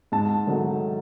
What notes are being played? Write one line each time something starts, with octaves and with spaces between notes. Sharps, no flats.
G#2 A5
D#3 F#3 A3